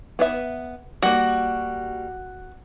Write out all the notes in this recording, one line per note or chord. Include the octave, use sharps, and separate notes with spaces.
B3 B4 E5
G3 A#3 F#4